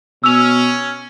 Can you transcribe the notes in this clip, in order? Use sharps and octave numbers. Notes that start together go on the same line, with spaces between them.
B2 C#4 E6 F7